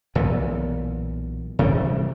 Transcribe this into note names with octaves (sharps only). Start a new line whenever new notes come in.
B1 A#2 E3 B3
C3 E3 G3